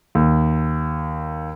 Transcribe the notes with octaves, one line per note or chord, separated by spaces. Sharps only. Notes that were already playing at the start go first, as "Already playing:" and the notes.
D#2